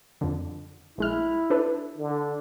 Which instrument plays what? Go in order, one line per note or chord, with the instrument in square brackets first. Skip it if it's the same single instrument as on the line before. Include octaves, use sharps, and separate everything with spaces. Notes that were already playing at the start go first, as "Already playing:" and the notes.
[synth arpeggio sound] F2 D3
[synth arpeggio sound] A#1 G#3 F6 [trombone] E4
[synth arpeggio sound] D4 A4 B4
[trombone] D3